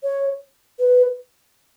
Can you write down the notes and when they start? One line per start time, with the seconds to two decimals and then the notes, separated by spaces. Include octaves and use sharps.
0.03 C#5
0.79 B4